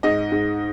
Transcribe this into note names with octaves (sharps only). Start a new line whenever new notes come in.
G#2 D#5
G#2